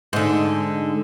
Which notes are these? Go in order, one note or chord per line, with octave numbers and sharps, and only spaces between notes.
G#2 D3